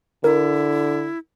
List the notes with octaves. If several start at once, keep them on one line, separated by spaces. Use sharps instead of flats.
D3 E4 A#4